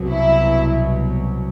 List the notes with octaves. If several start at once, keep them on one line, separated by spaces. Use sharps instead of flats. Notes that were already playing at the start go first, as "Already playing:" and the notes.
Already playing: C2 B2 F#3
E4